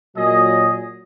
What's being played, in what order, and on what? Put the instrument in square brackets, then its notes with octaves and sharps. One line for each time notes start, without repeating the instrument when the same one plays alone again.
[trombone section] A#2 F#3 [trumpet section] G#4 D#5